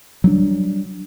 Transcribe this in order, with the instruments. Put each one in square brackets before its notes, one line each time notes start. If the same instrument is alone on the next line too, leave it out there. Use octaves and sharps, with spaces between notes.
[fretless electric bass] F#3 G3 D4